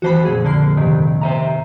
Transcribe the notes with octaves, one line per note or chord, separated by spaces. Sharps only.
F2 E3 F#4 C5 A5 B5
F2 A#2 G#4
D3 A#3 C7
G2 C3 D#3
C5 E5 A#5